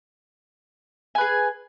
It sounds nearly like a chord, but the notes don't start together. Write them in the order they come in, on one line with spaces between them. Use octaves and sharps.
G#5 B4 G#4